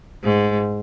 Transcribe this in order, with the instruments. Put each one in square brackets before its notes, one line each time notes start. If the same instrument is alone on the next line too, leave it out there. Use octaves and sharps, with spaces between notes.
[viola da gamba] G#2